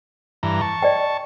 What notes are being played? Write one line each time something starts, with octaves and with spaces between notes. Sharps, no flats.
G2 E3 A#5
A5 C#6
D5 D#5 G5